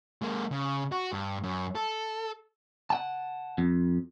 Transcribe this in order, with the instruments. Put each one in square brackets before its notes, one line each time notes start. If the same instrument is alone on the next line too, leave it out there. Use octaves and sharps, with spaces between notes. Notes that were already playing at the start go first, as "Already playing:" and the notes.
[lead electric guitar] G#3 A#3
C#3
F#4
G2
F#2
A4
[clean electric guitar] F#5 G5 A5
F2